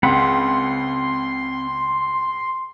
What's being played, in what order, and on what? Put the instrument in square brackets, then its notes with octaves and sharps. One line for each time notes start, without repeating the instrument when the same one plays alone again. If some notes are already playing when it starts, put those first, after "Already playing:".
[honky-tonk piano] C#2 [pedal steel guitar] C4 F#5 B5 [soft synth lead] C6